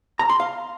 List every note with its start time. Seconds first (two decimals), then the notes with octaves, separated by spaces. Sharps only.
0.19 A#5
0.30 C6
0.40 F5